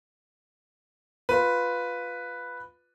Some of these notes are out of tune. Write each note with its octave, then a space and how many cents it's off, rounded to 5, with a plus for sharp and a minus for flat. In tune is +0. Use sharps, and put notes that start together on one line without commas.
F4 +10 B4 +0